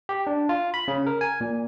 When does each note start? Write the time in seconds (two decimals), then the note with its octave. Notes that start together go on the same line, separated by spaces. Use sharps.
0.09 G4
0.27 D4
0.49 F4
0.74 B5
0.88 C#3
1.07 A#4
1.21 G#5
1.41 A#2